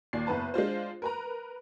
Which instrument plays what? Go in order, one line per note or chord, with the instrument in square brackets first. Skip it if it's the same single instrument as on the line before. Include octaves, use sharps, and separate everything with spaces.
[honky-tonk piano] D#2 A#2 D5 C7
F#1 B3 B4 A5
G#3 D4 F4 C5
A#4 B4 A#5